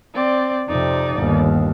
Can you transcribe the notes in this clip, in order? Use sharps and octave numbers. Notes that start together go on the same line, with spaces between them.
C4 D5
F2 C3 D#4 D5
G1 D#2